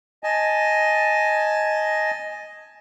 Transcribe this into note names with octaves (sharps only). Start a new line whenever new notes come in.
D#5 G#5 A5